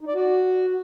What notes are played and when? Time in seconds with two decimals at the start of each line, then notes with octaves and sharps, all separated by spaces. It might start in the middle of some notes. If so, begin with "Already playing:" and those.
0.01 D#4
0.08 D5
0.15 F#4